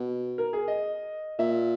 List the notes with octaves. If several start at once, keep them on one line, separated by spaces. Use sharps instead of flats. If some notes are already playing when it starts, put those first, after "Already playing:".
Already playing: B2
A#4
G#4
D#5
A#2 E5